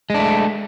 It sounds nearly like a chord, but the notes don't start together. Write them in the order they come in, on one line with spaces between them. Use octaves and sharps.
G#3 D4 A3